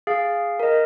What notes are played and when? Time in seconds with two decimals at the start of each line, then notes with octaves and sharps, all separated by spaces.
0.07 G#4 F5
0.60 A#4 D#5